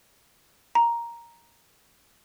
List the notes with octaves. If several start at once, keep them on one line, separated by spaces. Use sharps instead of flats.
A#5